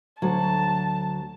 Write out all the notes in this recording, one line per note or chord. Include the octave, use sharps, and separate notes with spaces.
D2 F#3 A5